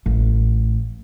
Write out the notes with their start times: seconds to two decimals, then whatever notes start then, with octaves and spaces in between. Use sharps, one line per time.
0.06 A1